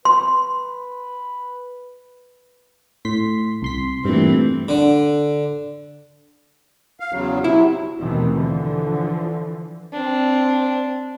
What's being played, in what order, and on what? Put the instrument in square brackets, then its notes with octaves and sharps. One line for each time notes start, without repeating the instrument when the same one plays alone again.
[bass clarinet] B4 [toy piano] C6
[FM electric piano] A2 C6 B6
C2 C6 B6
[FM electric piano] G2 A#2 [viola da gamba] E3 A3 C4
[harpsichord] D3
[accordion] F5
E2 C#3 F#3
[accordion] C3 F#3 [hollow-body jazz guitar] E4
[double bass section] D#2 B2 D#3 E3 A3 C4
D3 E3 F3
[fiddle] C4 D4